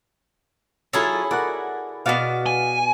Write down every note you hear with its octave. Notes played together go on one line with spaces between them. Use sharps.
F#3 E4 F4 G#4 A4
F#4 A#4 D5 F#5
B2 B3 F#4 D5 F5 F#5
G#5